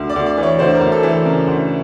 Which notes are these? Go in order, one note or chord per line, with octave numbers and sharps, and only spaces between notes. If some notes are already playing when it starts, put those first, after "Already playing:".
Already playing: D2
D5
D2
D5
E3
C#5
D2 C5
A#4
D2
A4
E3
A4
C#3 A#4
D2